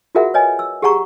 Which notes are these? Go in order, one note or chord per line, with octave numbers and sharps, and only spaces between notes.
F4 F#4 G#4 A#4 E5 F#5
B4 C#5 D#5 G#5
E6
G4 G#4 F#5 A#5 C#6